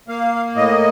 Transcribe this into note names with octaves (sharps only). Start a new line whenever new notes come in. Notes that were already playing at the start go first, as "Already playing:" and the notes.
A#3 F5
A2 D#5